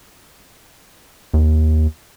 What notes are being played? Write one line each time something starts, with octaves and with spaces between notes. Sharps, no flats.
D#2